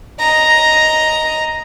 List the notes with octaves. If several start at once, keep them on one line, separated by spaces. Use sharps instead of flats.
D#5 A#5